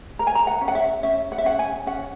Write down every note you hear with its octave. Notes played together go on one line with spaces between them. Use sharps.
A#4 A#5
G#5
A#5
F#5
C#4
F#5
E5
C#4 E5
F#5
E5
C#4 F#5
G#5
C#4 F#5